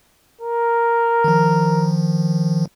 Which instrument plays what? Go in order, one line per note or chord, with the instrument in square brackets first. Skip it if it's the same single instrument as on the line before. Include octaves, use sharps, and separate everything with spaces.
[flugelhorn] A#4
[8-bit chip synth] D#3 F3